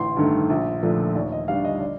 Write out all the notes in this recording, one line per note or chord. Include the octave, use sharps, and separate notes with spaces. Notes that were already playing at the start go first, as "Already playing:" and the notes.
Already playing: A1 C6
G2 D#3 A3
A#1
A#2 F3 A3 D4
D#2 D5
D#5
D#3 G3 D4 F5
D#5
D5